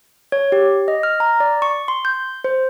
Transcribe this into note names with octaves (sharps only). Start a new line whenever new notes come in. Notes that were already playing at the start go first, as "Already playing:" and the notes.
C#5
G4
D#5
F6
A#5
D5
C#6
C6
G6
C5